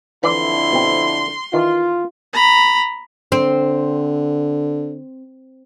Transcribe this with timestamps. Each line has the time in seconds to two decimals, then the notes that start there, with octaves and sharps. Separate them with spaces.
0.24 F2 D3 E3 E4 D5 C6
0.73 B2 C4
1.53 D#3 E3 F4
2.33 A#5 B5
3.32 D3 C4